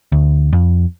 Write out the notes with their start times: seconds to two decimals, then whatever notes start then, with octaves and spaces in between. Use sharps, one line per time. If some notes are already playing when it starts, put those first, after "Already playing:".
0.12 D2
0.53 F2